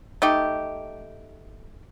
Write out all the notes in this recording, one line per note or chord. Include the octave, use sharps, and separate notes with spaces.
A3 D#4 G4